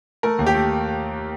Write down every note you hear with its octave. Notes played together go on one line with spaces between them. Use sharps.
A3 A#4
D#2
G4
A3